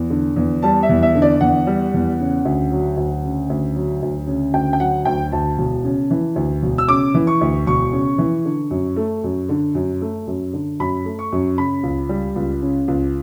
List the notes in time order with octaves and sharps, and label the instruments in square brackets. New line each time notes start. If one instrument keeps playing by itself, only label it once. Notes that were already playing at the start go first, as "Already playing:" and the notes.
Already playing: [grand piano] E2
D3
E2
G3 A5
E5
E2
E5
D3
D5
E2 F#5
G3
E2
C#3
D2
F#3
D2
C#3
D2
F#3
D2
C#3
D2 G5
G5
F#3 F#5
D2 G5
D2 A5
E1
C#3
E3
D2
E1
E6
C#3 D6
E3
C#6
D2
E1 C#6
C#3
E3
D3
F#2
A3
F#2
D3
F#2
A3
F#2
D3
F#2 B5
A3
C#6
F#2
C#3 B5
C#2
G3
C#2
C#3
C#2